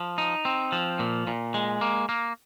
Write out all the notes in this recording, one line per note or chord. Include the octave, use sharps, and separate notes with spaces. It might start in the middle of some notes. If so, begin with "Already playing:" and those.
Already playing: F3
D#4
C4
F3
A#2
A#2
G#3
A#3
A#3